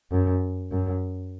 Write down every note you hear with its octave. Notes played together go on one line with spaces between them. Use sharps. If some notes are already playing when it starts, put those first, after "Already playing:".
F#2
F#2